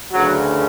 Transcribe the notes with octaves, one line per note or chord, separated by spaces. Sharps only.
D2 C#3 E3 F#3